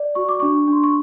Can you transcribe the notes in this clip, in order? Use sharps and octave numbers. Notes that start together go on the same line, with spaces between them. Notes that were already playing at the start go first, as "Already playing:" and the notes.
Already playing: D5
F#4 C#6
D6
D4 C#6
D4 C6
C#6